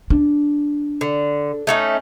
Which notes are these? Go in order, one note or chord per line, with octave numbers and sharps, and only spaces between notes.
D4
D3
A3 C#4 D#4